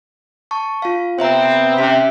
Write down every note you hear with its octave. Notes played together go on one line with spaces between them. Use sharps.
A5 C#6
F4 F5
C3 B3 C4 C5 E5 A#5
C3 C#4 E5 B6